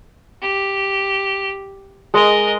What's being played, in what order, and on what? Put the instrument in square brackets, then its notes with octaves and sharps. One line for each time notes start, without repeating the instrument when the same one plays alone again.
[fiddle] G4
[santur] G#3 [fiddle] A#4 D#5